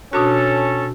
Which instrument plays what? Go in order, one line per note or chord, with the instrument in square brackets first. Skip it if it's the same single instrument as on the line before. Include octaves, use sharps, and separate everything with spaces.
[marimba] B2 D4 F#4 [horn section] C#4 A4